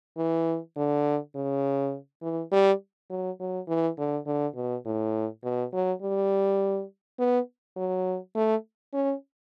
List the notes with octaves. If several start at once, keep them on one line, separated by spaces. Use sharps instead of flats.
E3
D3
C#3
E3
G3
F#3
F#3
E3
D3
D3
B2
A2
B2
F#3
G3
B3
F#3
A3
C#4